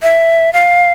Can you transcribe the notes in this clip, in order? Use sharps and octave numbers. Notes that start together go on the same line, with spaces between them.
E5
F5